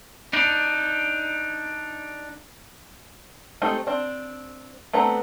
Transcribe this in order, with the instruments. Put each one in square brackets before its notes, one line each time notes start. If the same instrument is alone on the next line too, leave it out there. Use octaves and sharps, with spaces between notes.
[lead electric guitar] D4 D#4
[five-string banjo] G#3 A3 C4 D#4 G4
C4 D4
A3 B3 C4 D4 A#5